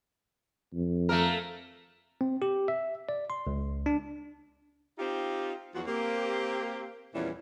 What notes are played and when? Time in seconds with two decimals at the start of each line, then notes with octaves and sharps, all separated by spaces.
0.73 F2
1.09 A3 A#3 A#4
2.21 C4
2.42 G4
2.68 E5
3.09 D5
3.30 C6
3.47 C#2
3.86 D4
4.99 C4 D#4 F4 G4
5.75 E2 F3 F#3 F#4
5.87 A#3 C4 G4
7.14 E2 A#2 E3 F3 G3 C#4